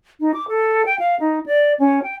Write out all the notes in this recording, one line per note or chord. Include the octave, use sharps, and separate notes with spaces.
D#4
D6
A4
G5
F5
D#4
D5
C#4
G5